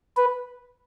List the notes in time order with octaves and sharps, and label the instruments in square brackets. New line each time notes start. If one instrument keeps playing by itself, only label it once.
[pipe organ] B4